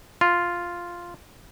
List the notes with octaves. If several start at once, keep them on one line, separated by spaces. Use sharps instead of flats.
F4